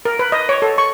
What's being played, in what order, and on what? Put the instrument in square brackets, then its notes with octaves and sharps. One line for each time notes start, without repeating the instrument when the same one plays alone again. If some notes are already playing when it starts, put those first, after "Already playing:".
[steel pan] A#4
B4
D#5
C#5
A4
C#6